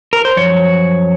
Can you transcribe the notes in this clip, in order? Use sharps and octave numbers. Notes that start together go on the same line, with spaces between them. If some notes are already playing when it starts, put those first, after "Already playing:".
A#4
C5
F#2 F3 C#5